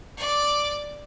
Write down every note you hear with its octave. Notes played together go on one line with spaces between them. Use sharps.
D5 D6